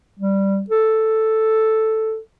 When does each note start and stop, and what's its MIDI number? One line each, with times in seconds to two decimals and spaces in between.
0.19 0.62 55
0.70 2.18 69